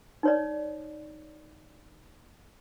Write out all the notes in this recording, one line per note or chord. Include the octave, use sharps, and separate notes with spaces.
D#4 C#5 D5